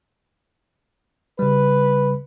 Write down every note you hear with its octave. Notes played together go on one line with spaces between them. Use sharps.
C#3 G3 B4